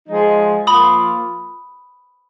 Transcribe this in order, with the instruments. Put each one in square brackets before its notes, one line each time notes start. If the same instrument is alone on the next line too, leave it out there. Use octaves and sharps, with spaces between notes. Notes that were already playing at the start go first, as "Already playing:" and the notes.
[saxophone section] F3 G#3 D#4 G#4
[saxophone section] F3 A#3 F4 [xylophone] B5 D#6